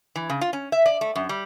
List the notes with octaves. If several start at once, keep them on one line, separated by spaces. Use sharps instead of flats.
E3
C#3
F4
C#4
E5
D5
A3
F#2
G3